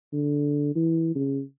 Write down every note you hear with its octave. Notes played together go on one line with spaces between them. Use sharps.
D3
E3
C#3